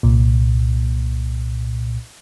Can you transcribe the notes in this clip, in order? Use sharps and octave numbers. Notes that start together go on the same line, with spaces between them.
C2 A#2